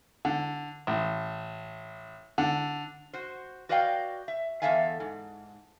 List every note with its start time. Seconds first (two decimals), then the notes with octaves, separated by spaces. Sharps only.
0.25 D3
0.87 A1
2.38 D3
3.13 F#4 C5
3.69 F#4 B4 D5 D#5 F5 G5
4.28 E5
4.62 E2 C#3 A4 E5 F5 G#5
5.00 G#2